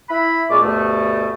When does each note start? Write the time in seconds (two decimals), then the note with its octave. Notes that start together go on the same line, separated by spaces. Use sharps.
0.10 E4 B5
0.50 A#2 G#3 C#4 D5 D6
0.62 D2 G2 B2 A3